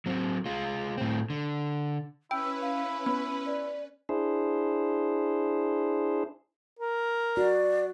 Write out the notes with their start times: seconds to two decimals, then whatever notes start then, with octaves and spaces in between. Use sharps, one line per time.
0.06 F#3 C4
0.46 G#3 F4
0.98 A2 C4
1.30 D3
2.31 C#4 E4 B4 G5 E6
2.62 F5
3.06 B3 B5
3.46 D5
4.09 D4 E4 G#4 C5
6.79 A#4
7.37 F#4 D5